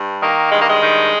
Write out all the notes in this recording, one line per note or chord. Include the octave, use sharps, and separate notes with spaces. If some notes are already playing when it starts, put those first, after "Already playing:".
Already playing: G2
D#3 A#3
G2 G#3
A#3
G#3
D#3